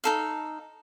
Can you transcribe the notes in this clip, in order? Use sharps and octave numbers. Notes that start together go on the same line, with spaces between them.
D#4 A4 F5